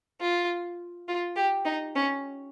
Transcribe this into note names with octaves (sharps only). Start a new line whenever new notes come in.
F4
F4
G4
D#4
C#4